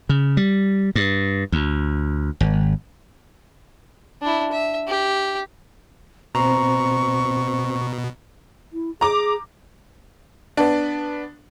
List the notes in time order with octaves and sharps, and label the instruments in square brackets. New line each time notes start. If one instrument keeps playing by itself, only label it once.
[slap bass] C#3
G3
G2
D2
G#1
[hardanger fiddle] D4 E4
E5
G4
[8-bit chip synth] B2 [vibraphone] C4 C5 [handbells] A#5 [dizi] C#6
[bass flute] E4
[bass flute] G#4 [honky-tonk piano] A#5 D6
[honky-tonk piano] B3 D4